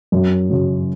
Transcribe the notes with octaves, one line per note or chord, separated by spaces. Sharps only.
F#2
C#3 F#3